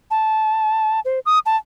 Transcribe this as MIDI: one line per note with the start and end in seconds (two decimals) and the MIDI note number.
0.11 1.00 81
1.05 1.19 72
1.26 1.39 87
1.46 1.56 81